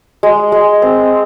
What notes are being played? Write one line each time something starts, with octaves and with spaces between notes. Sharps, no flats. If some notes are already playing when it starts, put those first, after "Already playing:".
G#3
G#3
C4